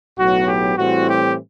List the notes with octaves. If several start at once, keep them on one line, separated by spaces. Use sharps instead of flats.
B1 A2 F#3 B3 F#4
G4
A2 E3 G3 C4 F#4
G4